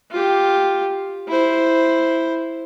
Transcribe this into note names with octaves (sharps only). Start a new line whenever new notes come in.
F4 G4
E4 C5